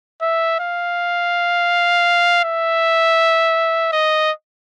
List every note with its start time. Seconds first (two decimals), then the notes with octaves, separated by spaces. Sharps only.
0.22 E5
0.60 F5
2.44 E5
3.92 D#5